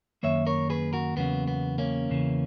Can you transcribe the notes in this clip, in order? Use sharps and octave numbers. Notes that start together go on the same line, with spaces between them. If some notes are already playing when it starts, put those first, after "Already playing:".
F#2 D#3 A#3 C#5 E5
A#4 C#5
G#4 B4
F#4 A#4
E2 C#3 F#3 A#3 B3
B3
A#3 C#4
E2 C#3 E3